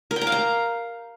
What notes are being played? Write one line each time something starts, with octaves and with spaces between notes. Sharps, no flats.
A#4
G5
A#5
F5
A#5